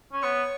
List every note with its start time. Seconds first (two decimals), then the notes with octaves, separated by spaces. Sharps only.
0.12 C#4
0.22 B3 C#5